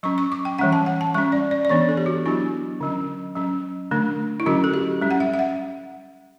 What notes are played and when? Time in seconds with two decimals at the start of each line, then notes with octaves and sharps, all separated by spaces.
0.03 F#3 C#4 C#6
0.18 C#6
0.32 D6
0.45 G5
0.59 E3 G3 C#4 F#5
0.72 A5
0.86 F#5
1.01 A5
1.14 G3 C#4 C#6
1.32 D5
1.51 D5
1.65 D5
1.69 E3 B3 D4 C#5
1.89 A4
1.97 G4
2.06 F#4
2.25 F#3 B3 D4 E4
2.81 D3 F#3 C#4
3.36 F#3 C#4
3.91 D3 A3 D4
4.40 E4
4.46 D3 F#3 C#4 F#4
4.64 A4
4.74 G4
5.01 G3 C#4
5.11 F#5
5.20 E5
5.33 E5
5.39 F#5